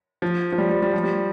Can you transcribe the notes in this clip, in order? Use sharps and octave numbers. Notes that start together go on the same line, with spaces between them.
F3
F3
G3
G3
G3
F3
G3